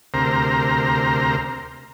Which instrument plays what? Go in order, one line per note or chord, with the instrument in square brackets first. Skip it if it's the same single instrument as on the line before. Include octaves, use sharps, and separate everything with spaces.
[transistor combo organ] D2 C3 A#4 C5 A#5